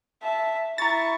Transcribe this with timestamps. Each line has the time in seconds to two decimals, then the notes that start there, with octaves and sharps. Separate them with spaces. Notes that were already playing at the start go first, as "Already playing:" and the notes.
0.22 E5 A5
0.78 E4 A#5 C#6 A6